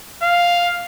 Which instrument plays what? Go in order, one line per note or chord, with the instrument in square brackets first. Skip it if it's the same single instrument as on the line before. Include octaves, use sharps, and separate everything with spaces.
[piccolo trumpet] F5